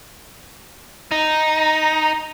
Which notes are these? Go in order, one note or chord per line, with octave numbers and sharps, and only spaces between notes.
D#4